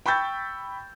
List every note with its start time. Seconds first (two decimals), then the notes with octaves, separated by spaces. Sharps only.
0.06 G5 B5 C#6 E6 G6 A6